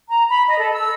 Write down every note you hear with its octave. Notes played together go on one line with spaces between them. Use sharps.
A#5
B5
D#5
A4
E6